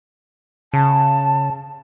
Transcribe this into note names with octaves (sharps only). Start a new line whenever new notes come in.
C#3 A5